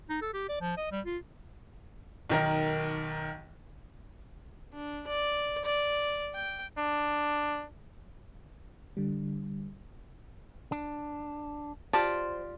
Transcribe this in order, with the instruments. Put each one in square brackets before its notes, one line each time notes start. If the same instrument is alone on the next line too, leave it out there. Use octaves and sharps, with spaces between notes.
[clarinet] D#4
A4
G4
D5
F3
D#5
G3
F4
[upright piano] B1 D#3 A#4
[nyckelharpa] D4
D5
D5
G5
[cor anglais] D4
[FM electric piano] D3 G3
[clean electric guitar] D4
[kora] F4 G4 D5 [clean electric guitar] C5 [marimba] A5